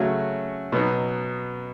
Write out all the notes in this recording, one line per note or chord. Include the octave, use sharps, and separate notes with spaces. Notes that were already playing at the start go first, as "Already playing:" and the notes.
Already playing: C#3 F#3 A3 C#4 F#4
B2 F#3 B3 D#4